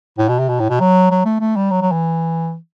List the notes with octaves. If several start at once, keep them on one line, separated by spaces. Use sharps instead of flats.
A2
B2
C3
B2
A2
B2
F#3
F#3
A3
A3
G3
F#3
F#3
E3